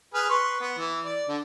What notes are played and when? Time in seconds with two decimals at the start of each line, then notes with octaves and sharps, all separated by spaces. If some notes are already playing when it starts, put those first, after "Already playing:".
0.14 G#4 B4 F6
0.30 B4 C6 C#6
0.61 B3
0.78 E3
1.04 D5
1.29 D3